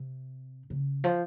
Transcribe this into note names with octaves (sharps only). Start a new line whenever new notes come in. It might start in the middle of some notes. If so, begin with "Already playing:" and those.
Already playing: C3
C#3
F3